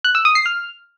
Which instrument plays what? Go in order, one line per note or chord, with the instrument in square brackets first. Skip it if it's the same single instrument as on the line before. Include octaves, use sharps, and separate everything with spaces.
[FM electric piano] F#6
E6
D#6
C7
F6